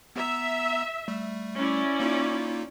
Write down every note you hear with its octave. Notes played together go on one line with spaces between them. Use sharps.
B3 E5 A#5
G3 A3
C#4 E4 D5
A#3 D#4 F4